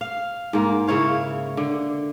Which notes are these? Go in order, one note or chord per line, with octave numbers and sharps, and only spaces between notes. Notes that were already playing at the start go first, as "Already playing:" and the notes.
F5
G#2 A#3
C#3 E4 C#5 F5
D3